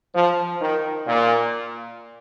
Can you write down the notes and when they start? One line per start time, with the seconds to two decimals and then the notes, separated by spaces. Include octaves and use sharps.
0.15 F3
0.61 D#3
1.07 A#2